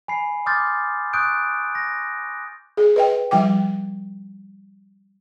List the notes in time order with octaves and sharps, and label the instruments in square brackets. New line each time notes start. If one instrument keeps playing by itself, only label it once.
[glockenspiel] G#5 B5 C7
C6 D6 D#6 F6 G6 A6
C#6 D#6 F#6 G6 D7
A#6
[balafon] G#4
B4 D#5 G5
F3 G3 G5 D6